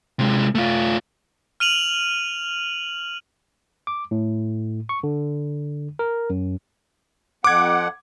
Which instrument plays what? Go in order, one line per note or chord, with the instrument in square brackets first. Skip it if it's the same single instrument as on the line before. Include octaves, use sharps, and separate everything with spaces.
[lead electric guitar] C3 G#3
A3 F4
[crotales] F6 D#7 F7 F#7
[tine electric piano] D6
A2
C#6
D3
A#4
F#2
[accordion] F2 F#5 [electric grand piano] D6 G#6